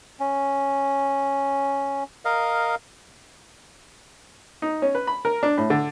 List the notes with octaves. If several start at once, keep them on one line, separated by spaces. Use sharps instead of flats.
C#4
A#4 D#5 F5
D#4
C#4
B4
B5
A#4
D4
A2
D3